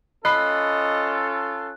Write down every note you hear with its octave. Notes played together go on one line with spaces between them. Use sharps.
C#4 F4 A4 D#5 B5 F#6 C7